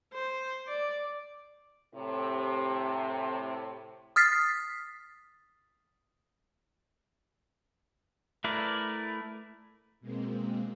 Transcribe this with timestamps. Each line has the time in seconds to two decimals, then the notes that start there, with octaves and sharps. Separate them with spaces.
0.13 C5
0.68 D5
1.94 A2 C3
4.16 D#6 F6 A6 B6 C7
8.44 A3 E4 A#4 B4 D5
10.00 B2 G#3 A#3 C4